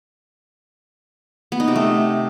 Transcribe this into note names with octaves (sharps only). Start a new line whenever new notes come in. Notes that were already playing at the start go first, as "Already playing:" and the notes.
B3
D#4
C3
A3